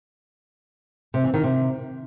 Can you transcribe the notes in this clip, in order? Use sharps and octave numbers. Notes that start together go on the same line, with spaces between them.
C3
E3
D#3
C3